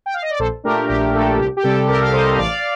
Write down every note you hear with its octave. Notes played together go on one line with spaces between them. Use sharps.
G5
F5
D#5
D5
A#1 A4 C5
A#2 A3 D4 G4 A#4
A#1 G4
A#2 A3 D4 A4
C2 G4
G4
C3 G3 A4
C2 G4 A#4
F5
C3 G3 C5 D#5
A1 D5 F5